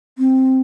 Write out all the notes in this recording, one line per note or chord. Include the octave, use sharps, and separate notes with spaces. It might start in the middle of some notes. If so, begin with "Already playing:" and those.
C4